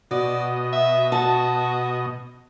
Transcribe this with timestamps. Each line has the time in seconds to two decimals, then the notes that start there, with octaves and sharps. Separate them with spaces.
0.11 B2 F#4 D5 D#5
0.73 E5
1.12 F#4 A5